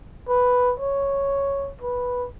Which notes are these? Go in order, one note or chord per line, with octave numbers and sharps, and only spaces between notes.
B4
C#5
B4